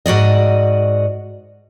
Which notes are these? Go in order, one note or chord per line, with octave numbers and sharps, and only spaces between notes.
G#2 F#4 D5 D#5